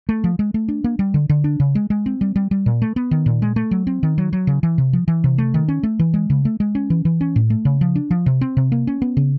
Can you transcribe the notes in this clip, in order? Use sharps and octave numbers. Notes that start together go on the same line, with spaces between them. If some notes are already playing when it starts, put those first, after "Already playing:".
A3
F3
G#3
A3
D4
A#3
G3
D3
D3
D4
C#3
G#3
G#3
C4
G3
G3
G3
A#2
A3
B3
D#3
A#2
G#3
A3
F#3
C4
D#3
F#3
F#3
C#3
E3
C3
F3
E3
C3
A3
D#3
C#4
A3
E3
G#3
C#3
A3
G#3
C#4
E3
E3
C#4
A2
A3
C#3
F3
D4
F3
C3
C4
C3
A#3
C#4
B3
C#3